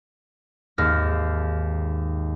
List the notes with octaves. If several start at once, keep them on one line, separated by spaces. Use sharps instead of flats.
G#1 D#2 E6 F6 A#6